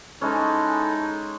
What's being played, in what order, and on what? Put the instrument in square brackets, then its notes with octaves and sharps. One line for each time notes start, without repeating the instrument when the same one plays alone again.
[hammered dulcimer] G#3 C#4 [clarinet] D#4 [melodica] E4 A4